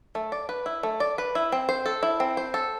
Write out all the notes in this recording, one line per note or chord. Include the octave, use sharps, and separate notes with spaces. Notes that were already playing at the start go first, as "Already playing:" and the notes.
A3
D5
B4
E4
A3
D5
B4
E4
C4
C5
A4
E4
C4
C5
A4